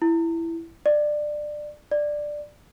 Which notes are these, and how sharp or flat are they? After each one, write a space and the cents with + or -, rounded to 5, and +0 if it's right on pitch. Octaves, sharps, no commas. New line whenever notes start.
E4 +10
D5 +20
D5 +10